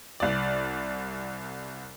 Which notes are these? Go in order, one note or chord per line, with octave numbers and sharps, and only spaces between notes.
C2 D5